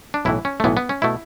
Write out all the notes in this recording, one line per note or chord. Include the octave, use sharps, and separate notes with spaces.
D4
B1 A2 E3 E4
C#4
A3
B1 A2 E3 B3
B3
C#4
B2 A3 E4